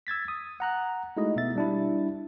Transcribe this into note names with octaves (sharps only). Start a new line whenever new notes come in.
E6 G#6 A6 B6
D#6
F#5 A#5 F#6
G#3 A3 D#4 E4 F#4 D#5
B2 B3 E5 A6
G3 D4 E4